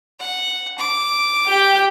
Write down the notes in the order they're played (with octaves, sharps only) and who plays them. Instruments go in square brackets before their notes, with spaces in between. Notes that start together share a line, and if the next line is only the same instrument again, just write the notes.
[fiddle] F#5
D6
[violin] G4 G5